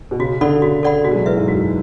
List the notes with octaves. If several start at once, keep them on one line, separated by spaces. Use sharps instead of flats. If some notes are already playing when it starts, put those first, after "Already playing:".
B2
C#3 F#4
D3 A4 D5 F#5 B5
C#3 F#4
A4 D5 F#5 B5
B2 F#4
G#3
F#3
E3 B4 E5
G#2
F#2 F#4